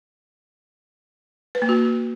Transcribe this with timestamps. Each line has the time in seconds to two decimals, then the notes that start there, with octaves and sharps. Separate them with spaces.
1.55 B4
1.62 A#3
1.69 F#4